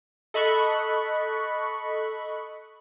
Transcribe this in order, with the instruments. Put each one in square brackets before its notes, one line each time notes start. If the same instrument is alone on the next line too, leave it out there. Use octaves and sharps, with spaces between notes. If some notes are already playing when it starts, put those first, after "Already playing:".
[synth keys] A4 D#5 B5 C#6 F#6